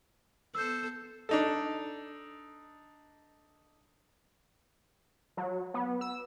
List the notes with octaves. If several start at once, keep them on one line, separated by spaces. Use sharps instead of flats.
B3 A4 C5 E6 G6
D4 D#4 A4
F#3
B3
E6